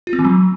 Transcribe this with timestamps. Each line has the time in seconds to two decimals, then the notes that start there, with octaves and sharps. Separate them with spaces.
0.07 F4
0.13 C4
0.19 E3
0.25 F#3